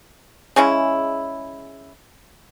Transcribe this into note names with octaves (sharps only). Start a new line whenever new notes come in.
C#3 G#3 C#4 E4